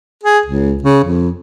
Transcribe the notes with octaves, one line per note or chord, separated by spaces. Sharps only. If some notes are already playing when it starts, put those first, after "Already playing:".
G#4
C#2
C#3
F2